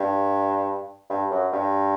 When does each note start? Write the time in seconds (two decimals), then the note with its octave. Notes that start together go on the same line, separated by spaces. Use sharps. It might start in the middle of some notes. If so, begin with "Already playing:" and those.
Already playing: G2
1.10 G2
1.31 F#2
1.53 G2